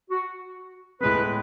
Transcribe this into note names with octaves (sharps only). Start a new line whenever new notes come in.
F#4
A2 G#3 B3 B4